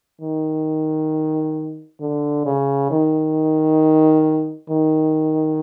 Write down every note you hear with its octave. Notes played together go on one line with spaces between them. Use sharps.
D#3
D3
C#3
D#3
D#3